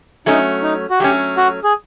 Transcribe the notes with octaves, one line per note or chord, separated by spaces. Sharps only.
F#3 A3 C#4 D#4
D#4
F#4
F#3 A3 C#4 G4
F#4
G#4